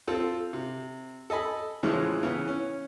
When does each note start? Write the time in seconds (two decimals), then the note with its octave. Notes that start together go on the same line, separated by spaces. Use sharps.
0.07 C4 F4 A4
0.53 C3
1.30 A4 D#5 G#5 B5
1.83 E2 A2 C#3 E3 F3 G#3
2.23 C#3 E3 B3
2.48 C#4